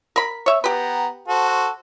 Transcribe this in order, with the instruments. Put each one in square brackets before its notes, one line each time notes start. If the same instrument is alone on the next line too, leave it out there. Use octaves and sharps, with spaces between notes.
[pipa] A#4 B5
C#5 E5
[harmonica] B3 G5 A#5 [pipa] G4 B4
[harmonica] F#4 A4 C5